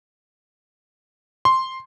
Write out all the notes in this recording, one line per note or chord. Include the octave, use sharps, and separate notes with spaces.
C6